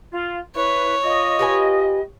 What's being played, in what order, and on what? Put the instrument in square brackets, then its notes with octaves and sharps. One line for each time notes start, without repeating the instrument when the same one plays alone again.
[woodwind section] F4
[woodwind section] E4 B4 [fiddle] C#5
[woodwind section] F4 D#5
[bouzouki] G4 B4 G#5